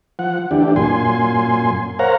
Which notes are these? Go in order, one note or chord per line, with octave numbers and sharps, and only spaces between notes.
F3 F#5
D2 E3 D4 G4
F#2 A#2 G#5 C6
A#4 C5 C#5 F5 F#5 A#5